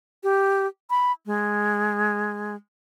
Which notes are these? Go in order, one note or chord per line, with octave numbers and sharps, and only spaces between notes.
G4
B5
G#3